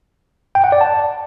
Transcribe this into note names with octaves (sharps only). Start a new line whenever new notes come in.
G5
F#5
D5
A5